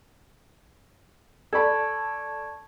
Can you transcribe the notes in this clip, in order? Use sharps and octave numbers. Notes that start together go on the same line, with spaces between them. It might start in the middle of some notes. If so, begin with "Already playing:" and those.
A4 D5 A5 B5 C#6 G#6